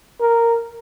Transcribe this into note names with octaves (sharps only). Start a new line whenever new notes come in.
A#4